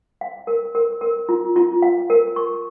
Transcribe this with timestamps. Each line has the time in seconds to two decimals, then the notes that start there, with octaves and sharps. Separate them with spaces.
0.21 F5
0.47 A#4
0.75 A#4
1.01 A#4
1.29 F4
1.56 F4
1.82 F5
2.10 A#4
2.36 C#6